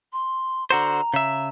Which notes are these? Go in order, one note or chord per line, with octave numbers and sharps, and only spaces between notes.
C6
D3 F#4 C5 A#5
C#3 E5